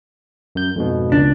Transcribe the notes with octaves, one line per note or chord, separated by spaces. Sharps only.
F#2 G6
F2 G#2 B2
C#2 D4